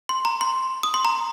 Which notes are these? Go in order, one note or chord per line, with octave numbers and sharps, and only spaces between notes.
C6
A#5
C6
D#6
C6
A#5